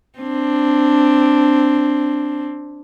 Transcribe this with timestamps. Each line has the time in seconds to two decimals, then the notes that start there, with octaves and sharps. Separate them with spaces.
0.19 C4 D4